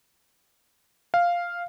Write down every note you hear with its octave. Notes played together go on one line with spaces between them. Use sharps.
F5